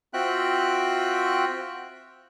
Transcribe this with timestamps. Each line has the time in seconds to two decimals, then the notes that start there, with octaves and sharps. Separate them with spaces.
0.14 C4 F4 F#4 E5 G5 F#6